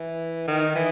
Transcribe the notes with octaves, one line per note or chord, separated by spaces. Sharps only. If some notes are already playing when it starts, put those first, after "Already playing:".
Already playing: E3
D#3
E3